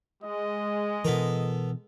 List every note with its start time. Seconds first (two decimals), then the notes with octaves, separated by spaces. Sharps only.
0.24 G#3 D#5
1.05 B2 E3 B3 A4 A#4